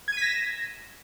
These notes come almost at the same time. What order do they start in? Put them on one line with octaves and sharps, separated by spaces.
G#6 D#7 B6 A#6 E7